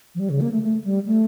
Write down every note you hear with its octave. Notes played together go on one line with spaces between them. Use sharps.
F3
G3
C#3
A#3
A3
A3
G3
A3